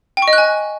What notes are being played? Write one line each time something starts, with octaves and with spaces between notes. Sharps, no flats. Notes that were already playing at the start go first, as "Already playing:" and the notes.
G5
C#6
D#5
F#6
G#5